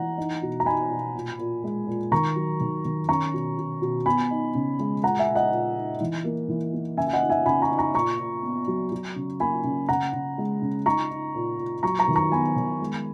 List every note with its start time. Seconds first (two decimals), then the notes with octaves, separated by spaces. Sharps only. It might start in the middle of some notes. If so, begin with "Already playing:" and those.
Already playing: E3 F#5 A#5
0.18 D#4
0.42 B2
0.60 A#5
0.66 D#4 G#5 B5
0.90 B2
1.15 A#2
1.39 A#2
1.64 G#3
1.87 A#2
2.12 D#3 A#5 C#6
2.36 F#3
2.61 D#3
2.85 D#3
3.09 C#4 A#5 C#6
3.34 B2
3.58 B2
3.82 B2
4.06 B3 G#5 B5
4.31 D#4
4.55 C#3
4.80 G#3
5.03 A#2 F#5 A#5
5.19 E5 G#5
5.28 A#2
5.35 D#5 F#5
5.51 A#2
5.77 D#4
6.01 E3
6.25 A#3
6.49 E3
6.73 A#3
6.97 C#3 E5 G#5
7.07 G#5
7.13 D#5 F#5
7.22 D#4
7.30 E5 G#5
7.46 C#3 G#5 B5
7.62 A#5 C#6
7.71 D#4
7.78 A#5 C#6
7.95 A#2 A#5 C#6
8.19 A#2
8.43 B3
8.68 F#3
8.92 F#3
9.16 C#3
9.40 A#3 G#5 B5
9.64 C#3
9.89 C#3 F#5 A#5
10.13 C#3
10.38 G#3
10.62 C#3
10.86 D#4 A#5 C#6
11.11 D#4
11.35 A#2
11.58 A#2
11.83 F#3 A#5 C#6
11.99 A#5 C#6
12.08 D#3
12.16 A#5 C#6
12.32 B3 G#5 B5
12.56 D#3
12.81 G#3